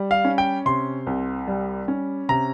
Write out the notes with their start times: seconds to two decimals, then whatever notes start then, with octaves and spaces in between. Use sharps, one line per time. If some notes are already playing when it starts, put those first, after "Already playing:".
Already playing: G3
0.11 F5
0.25 C#4
0.38 G5
0.65 C3 C6
1.07 C2
1.47 G3
1.88 C#4
2.29 C3 A#5